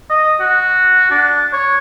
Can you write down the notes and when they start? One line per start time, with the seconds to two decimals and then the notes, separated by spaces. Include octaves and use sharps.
0.10 D#5
0.40 F#4
1.11 D4
1.53 C#5